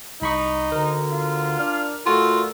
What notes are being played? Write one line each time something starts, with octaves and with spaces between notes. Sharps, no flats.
C2 D#4 B5 C#6
D2 D3 A#4
F4
D4 F6
A#2 A3 F4 F#4 A4